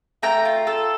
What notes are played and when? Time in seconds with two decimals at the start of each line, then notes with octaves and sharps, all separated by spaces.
0.23 A3 G5 A#5
0.45 F4
0.67 A4